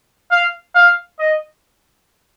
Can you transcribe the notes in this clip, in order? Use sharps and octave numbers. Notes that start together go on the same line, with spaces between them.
F5
F5
D#5